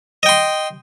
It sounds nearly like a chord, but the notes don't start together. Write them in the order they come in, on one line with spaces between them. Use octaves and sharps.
D#5 G5 C6